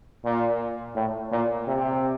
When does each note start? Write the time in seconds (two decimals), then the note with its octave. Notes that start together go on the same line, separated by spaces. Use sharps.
0.25 A#2
0.96 A2
1.32 A#2
1.68 C3